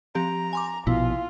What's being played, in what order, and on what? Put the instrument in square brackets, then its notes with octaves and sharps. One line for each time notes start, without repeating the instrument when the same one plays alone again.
[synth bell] F3 C4 G4 [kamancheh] A#5
[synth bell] G#5 C6 D6
[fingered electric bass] A#1 B2 [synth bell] E4 [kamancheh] F4